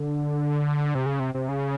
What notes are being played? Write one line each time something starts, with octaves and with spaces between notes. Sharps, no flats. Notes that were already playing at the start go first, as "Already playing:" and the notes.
Already playing: D3
C3
C#3
C3
C3
C#3